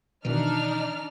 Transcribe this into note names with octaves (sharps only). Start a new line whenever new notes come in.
B2 D#3 E3 D4 D#4 F6